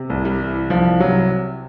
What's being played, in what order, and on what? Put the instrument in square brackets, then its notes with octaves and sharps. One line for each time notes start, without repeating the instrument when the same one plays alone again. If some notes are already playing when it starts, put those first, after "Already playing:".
Already playing: [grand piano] C3
C2
[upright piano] G3
[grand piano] E3
[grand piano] C2 [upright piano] F3
[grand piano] C3 [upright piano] F#3